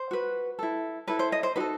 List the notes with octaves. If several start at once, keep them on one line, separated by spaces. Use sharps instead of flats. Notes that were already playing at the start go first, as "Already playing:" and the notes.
Already playing: C5
F#4 B4
E4 A4
E4 A4 B4
C5
D#5
C5
D#4 F#4 A4 B4